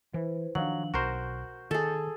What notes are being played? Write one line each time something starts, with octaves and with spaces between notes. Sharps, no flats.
E3 E4 B4 C5
D#3 F3 F#3 D4 F5 F#7
B1 F#4 A#4 C5 C#6 G6
D#3 G#4 A4